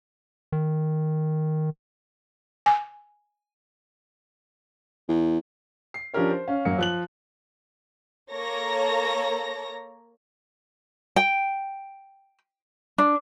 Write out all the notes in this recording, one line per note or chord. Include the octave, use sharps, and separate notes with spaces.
D#3
G#5
E2
C7
F3 C#4 D4 G4 A#4 C#5
C5
C#4 F5
F#2 F#3 A#3 C#7
F3 F#6 F#7
A#3 A4 C#5 A#5 A#6
G5
D4